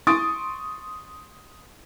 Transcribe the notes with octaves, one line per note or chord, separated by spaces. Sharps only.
C6 C#6 D#6 A6 D7